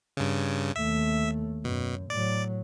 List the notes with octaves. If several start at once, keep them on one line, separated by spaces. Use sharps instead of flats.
G2 C#3
D#2 A3 E5
F#2 B2
A2 F#3 D5